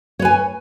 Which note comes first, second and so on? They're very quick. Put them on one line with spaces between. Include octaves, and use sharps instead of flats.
C#5 B4 G#5